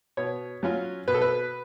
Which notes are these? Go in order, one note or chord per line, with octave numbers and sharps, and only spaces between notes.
B2 C#5
F#3 C#4 F4
B2 B4
A4
B4